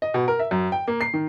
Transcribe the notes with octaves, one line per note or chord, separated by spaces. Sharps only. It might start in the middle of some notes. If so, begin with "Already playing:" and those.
D#5
B2
A#4
E5
F#2
G5
A#3
C7
D#3